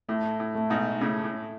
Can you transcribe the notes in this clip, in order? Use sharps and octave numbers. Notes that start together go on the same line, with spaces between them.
A2 A3
A2
A3
G#2 B2
A2 C#3 A3
A2